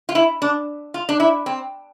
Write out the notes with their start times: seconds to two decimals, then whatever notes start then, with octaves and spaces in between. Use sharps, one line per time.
0.09 F4
0.15 E4
0.42 D4
0.94 F4
1.09 D4
1.20 E4
1.46 C4